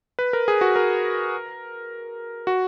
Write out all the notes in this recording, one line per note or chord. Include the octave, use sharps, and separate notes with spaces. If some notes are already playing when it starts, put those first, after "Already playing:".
B4
A#4
G#4
F#4
A#4
F#4